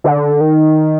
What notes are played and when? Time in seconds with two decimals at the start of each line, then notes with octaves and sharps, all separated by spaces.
0.04 D3
0.41 D#3